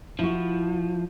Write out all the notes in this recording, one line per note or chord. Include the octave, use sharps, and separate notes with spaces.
F3 E4 F#4